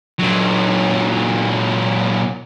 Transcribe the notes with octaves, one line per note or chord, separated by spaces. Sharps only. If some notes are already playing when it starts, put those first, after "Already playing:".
A#2 F#3